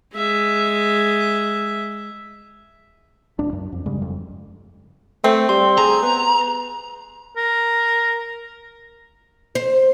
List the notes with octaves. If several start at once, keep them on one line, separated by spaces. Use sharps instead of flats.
G#3 E5
D1 C#2 A2 D4
F#2
F2
G2 C#3 G3 G#3
F#1 F2
A3 C4
G3 C6
G#4 A#5
B3
A#4
C5